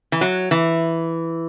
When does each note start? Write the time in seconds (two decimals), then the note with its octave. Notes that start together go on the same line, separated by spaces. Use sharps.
0.12 E3
0.21 F#3
0.51 E3